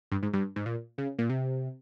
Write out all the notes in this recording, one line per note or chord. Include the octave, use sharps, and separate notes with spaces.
G2
G#2
G2
G#2
A#2
C#3
A#2
C3